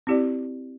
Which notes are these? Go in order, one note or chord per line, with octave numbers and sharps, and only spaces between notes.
C4 E4 G4 D5